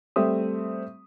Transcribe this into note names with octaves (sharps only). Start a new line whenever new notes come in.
G3 A3 C4 E5 D#6